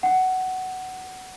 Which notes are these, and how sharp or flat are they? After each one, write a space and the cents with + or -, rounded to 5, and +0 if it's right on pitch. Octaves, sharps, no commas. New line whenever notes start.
F#5 +15